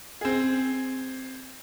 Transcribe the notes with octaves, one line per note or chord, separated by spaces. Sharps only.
C4 G#4